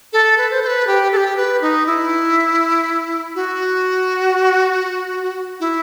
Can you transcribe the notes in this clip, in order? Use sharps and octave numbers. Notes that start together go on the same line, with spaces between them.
A4
B4
C5
C5
B4
G4
A4
G4
B4
D#4
E4
F#4
E4